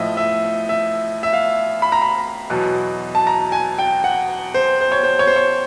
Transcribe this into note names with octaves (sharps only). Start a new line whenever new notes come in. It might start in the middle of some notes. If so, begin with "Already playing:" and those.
Already playing: A2 F3 D#5 E5
E5
E5
E5
F5
B5
A#5
B5
E2 B2 F#3
A5
A#5
G#5
G5
F#5
C5
C5
C#5
C5
C#5
C5
C#5